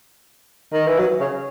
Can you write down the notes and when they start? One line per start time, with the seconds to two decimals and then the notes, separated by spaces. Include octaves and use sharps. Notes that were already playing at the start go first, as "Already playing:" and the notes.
0.73 D#3
0.87 E3
0.99 F#3
1.20 C#3